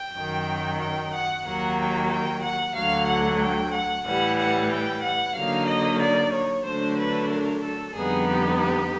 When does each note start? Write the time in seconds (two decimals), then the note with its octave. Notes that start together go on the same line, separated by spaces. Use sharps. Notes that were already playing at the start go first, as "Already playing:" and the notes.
Already playing: G5
0.15 F#2 D#3 F#3
0.81 G5
1.13 F#5
1.46 D#2 D#3 F#3 A#3 F#5
1.78 G5
2.10 G5
2.43 F#5
2.75 D2 D3 F#3 F5
3.08 F#5
3.41 G5
3.73 F#5
4.06 A2 E3 G3 F#5
4.39 F#5
4.71 G5
5.03 F#5
5.36 D3 F#3 A#3 D#4 F5
5.68 D#5
6.00 D5
6.33 C#5
6.65 D3 F#3 A3 D4 C5
6.99 B4
7.30 A#4
7.63 A4
7.95 F2 D3 G3 B3 D#4 G#4
8.28 G4
8.61 G4